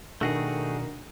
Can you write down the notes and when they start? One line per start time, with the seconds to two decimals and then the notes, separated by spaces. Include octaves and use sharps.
0.21 B2 D#3 A3 D4 F#4 G#4